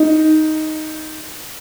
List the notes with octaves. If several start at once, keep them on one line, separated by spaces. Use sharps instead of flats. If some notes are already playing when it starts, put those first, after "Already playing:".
Already playing: D#4